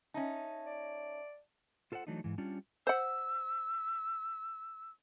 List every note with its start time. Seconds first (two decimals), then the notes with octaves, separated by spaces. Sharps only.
0.14 C#4 D#4 E5 A5
0.66 D5
1.92 F4 A4 C5 D#5 F#5
2.07 E3 F#3 A3 D4 D#4
2.24 G#2 E3
2.38 G3 C#4 D4 F4
2.87 C5 F#5 E6